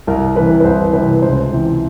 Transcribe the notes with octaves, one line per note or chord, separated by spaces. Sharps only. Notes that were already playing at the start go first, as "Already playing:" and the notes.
C2 A#4
C3 E3 B4
B4
C2 C5
C3 E3 B4
C#2 C5
C3 E3